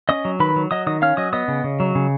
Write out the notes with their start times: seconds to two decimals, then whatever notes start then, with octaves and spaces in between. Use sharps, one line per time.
0.09 C#4 D#5 D#6
0.25 F#3
0.40 D#3 B4 B5
0.56 F#3
0.71 F#3 D#5 D#6
0.87 D#3 D#5 D#6
1.02 C#4 F5 F6
1.17 F#3 D#5 D#6
1.33 B3 D#5 D#6
1.48 C#3
1.64 C#3
1.80 F#3
1.95 C#3